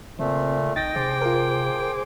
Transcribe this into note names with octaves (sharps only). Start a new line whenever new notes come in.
A#2 C#3 A3 C4
A#1 D#4 D#5 G5 A6 A#6
C3 G#4 C5 D6
F4 A#4